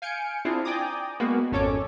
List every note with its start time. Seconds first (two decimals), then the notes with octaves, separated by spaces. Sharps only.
0.02 F5 G#5 G6 C#7 D7
0.45 C4 D4 E4 F4 G#4 C5
0.65 D5 G5 G#5 A#5 D6 D#6
1.20 G#3 A#3 B3 F#4
1.51 G#1 F2 C#4 A4 C#5 D6